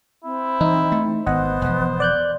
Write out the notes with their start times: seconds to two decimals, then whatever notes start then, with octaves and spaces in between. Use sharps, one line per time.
0.24 C4 E4
0.61 E3 D#4
0.92 A3
1.26 G#1 B3 C5 D#5 F#5
1.62 E1 F3
2.00 D5 F#6 G6